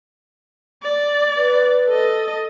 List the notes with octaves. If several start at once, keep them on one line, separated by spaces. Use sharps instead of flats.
D5
B4
A4 D#5